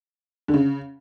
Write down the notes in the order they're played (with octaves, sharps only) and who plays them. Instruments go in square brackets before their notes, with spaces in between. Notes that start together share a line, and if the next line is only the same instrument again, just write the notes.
[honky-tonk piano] D3
C#3